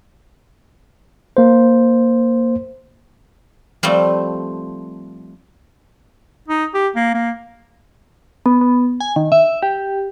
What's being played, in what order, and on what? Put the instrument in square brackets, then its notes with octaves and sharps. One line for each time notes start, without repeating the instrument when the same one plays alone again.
[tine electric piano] A#3 C5
[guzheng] F3 G3 A3 C4
[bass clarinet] D#4
G4
A#3
A#3
[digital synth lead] B3
B3
G#5
D#3
E5
G4